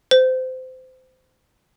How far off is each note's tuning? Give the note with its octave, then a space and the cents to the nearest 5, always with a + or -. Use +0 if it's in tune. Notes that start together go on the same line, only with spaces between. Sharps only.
C5 -25